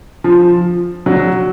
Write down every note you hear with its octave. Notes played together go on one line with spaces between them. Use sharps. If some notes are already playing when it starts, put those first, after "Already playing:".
F3
F#3